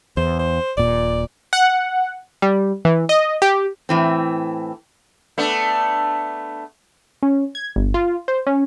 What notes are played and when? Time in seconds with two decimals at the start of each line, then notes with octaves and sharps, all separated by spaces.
0.17 E2 C5
0.39 C5
0.77 D#1 A#2 D5
1.53 F#5
2.42 G3
2.85 E3
3.09 D#5
3.42 G4
3.89 A2 E3 C4
5.38 A3 B3 D4
7.23 C#4
7.55 G#6
7.76 G1
7.94 F4
8.28 C5
8.47 C#4